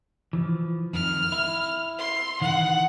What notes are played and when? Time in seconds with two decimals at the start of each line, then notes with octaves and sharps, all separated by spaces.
0.33 E3 F3
0.93 F2 D#3 F6
1.32 E4
1.98 C6
2.41 D#3 E3 F#5